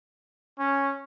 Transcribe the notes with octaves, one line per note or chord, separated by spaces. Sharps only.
C#4